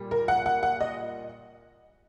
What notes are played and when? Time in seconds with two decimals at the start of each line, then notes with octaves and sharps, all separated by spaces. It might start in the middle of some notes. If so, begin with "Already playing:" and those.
Already playing: A#2 G3
0.11 A#4
0.28 F#5
0.46 F#5
0.63 F#5
0.81 D#5